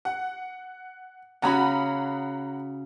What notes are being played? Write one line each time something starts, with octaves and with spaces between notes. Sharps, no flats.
F#5
C#3 C#4 F#4 F#5 A#5 B5